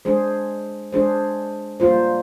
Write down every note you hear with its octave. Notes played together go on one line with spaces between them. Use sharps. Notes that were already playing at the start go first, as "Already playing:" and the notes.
G#3 D4 G#4 C5
G#3 D4 G#4 C5
G3 A#3 F4 C5